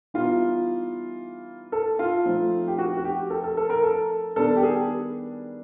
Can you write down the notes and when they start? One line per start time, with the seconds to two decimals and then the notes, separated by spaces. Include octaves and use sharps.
0.14 E3 G3 B3 D#4 F4
1.72 A4
1.99 F4
2.25 F3 A3 C4 D#4
2.67 G4
2.78 F#4
2.97 F#4
3.05 G4
3.30 A4
3.44 A4
3.57 A4
3.70 A#4
3.83 A4
4.36 D#3 G3 B3 D4 A4
4.56 G4
4.63 G#4